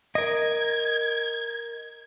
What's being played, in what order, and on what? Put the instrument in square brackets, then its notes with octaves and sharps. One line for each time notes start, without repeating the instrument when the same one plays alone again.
[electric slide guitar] A#4 D#5 [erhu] G#6